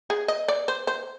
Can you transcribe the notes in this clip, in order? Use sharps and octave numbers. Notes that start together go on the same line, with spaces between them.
G#4
D#5
D5
C5
C5